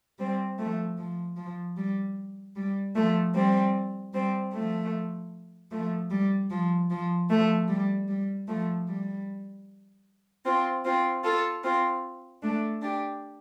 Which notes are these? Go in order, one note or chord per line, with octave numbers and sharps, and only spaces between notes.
G3 C4
F3 A3
F3
F3
G3
G3
F3 A3
G3 C4
G3 C4
F3 A3
F3 A3
G3
F3
F3
F3 A3
G3
G3
F3 A3
G3
C4 F4
C4 F4
F4 A4
C4 F4
A3 D4
D4 G4